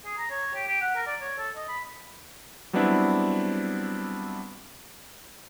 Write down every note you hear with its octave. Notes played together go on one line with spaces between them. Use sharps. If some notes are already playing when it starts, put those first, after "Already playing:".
G#4
A#5
C#5
G4
G4
F#5
A#4
D5
C#5
A4
D#5
B5
F#3 G3 B3 C4 D4 E4